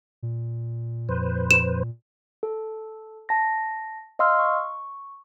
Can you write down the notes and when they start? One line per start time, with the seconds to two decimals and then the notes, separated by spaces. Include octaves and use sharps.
0.23 A#2
1.09 F2 B4 C5
1.51 E7
2.43 A4
3.29 A5 A#6
4.19 D#5 F5 C6 E6 F6
4.39 C#6